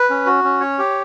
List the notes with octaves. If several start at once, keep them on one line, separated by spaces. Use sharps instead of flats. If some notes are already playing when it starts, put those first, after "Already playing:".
Already playing: B4
C#4
F#4
C#4
C#5
G4